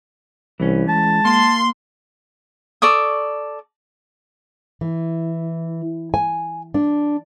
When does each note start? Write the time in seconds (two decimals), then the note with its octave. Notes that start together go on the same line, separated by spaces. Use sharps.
0.60 C2 E3 C#4
0.89 G#3 A5
1.25 A#3 C6
2.82 A4 D5 C#6 D#6
4.81 E3
6.14 G#5
6.74 D4